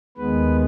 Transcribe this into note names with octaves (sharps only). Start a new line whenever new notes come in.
D#2 D#3 G#3 B3 B4